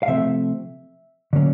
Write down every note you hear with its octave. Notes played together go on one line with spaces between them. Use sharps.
F5
C3 F3 A3 C4 E5
D3 F#3 A#3 C#4